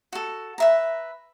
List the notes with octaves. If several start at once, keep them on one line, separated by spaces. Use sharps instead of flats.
F#4 A4
B4 E5 A#5